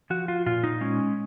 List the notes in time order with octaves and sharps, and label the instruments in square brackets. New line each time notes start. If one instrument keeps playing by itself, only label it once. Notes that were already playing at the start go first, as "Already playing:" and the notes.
[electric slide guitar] F3 F#4
F4
A#2 F4
D#4
G#3 C#4